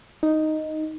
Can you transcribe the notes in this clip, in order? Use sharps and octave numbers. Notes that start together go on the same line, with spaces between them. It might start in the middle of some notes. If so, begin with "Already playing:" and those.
D#4